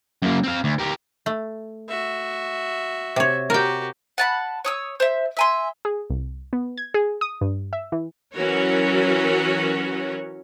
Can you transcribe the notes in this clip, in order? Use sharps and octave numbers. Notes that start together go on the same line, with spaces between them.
F#2 A#3
C4 F5
D2
G4 A#4
A3
F#4 E5
C3 C#5
F#4 G4 A#4 G5
F#5 A5 B5
C#5 D#6 E6
C5 E5
E5 G#5 C6
G#4
C2
B3
G#6
G#4
D#6
G2
E5
E3
E3 F#3 C#4 F#4 A#4 C#5